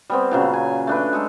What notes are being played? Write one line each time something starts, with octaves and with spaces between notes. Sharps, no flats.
G3 B3 C4
A#2 C#3 F#3
G#5
A3 D4 B4
G#3 A4